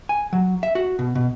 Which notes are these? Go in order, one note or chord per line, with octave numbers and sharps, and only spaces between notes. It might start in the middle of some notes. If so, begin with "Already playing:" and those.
G#5
F#3
E5
F#4
B2
B2